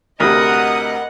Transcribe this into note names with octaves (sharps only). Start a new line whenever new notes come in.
D2 C3 A#4 B4 D#5 F#5 D#6